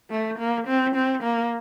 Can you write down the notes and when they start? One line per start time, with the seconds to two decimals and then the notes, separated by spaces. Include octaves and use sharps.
0.11 A3
0.39 A#3
0.67 C4
0.95 C4
1.23 A#3